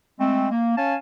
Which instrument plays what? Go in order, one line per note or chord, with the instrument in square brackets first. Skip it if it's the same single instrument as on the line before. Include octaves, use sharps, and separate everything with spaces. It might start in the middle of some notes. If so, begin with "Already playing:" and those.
[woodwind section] G#3 A3 C4
A#3
C#4 C#5 F5 G#5 A5